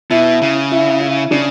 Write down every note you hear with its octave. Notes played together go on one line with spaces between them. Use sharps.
B2 E4
C#3
E4
E4
C#3 D4